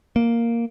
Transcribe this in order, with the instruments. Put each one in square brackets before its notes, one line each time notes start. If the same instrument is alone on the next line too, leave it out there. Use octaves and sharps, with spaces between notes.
[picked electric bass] A#3